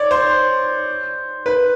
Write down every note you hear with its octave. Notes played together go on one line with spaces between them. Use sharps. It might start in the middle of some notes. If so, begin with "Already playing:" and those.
Already playing: C#5 D5
C5
B4